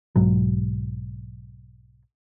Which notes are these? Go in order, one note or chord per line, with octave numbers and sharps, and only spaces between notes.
B1 G#2 F#3